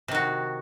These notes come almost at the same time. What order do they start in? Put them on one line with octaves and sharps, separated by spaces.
C3 D#3 F#4